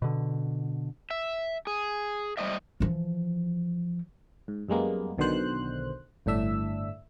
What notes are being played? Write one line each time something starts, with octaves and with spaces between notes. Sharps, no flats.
B2 D3
E5
G#4
G3 C5 D#5 E5
E3 F3
G#2
F#2 G3 G#3 A#3 B3
B1 B2 D3 D#3 C5 F#6
G1 A2 D4 E5 E6